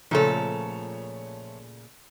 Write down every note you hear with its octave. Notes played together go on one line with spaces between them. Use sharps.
A#2 C#3 F3 A3 A4 C#5